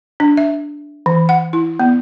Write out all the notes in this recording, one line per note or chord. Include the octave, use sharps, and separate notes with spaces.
D4
E5
E3
F#5
E4
B3